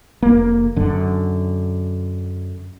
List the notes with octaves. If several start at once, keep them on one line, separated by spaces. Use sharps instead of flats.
F1 A#3
F#2 D3